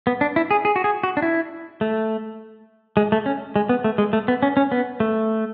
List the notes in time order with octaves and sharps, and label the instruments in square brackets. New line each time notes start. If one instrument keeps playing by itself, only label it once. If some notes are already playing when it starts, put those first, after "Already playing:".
[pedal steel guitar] B3
D4
E4
G#4
G#4
F#4
G#4
F#4
D4
E4
A3
G#3
A3
C#4
G#3
B3
A3
G#3
A3
B3
C#4
C#4
B3
A3